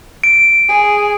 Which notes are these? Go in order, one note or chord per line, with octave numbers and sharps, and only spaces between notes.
D7
G#4